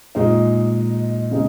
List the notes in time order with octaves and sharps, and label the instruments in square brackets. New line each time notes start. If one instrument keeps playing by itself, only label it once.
[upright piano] A#2 G#3 D#4
C#3 G#3 D#4